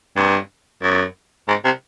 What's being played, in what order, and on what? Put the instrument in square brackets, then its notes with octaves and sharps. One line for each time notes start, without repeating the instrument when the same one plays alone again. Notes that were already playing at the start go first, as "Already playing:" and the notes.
[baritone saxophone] G2
F#2
G#2
C3